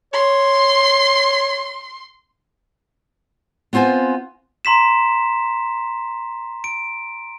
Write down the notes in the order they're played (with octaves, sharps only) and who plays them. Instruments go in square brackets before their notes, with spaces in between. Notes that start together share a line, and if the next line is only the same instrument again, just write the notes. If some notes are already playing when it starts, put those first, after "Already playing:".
[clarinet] C#5 [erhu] C6
[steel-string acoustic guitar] B3 C4 F4 C5 G#5
[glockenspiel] A#5 C6 B6 E7
D7